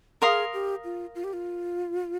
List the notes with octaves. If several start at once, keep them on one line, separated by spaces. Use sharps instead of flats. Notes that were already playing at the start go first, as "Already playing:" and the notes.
G#4 A#4 F5 C6 D#6
G4
F4
F4
G4
F4